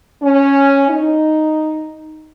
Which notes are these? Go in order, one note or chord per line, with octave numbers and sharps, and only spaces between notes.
C#4
D#4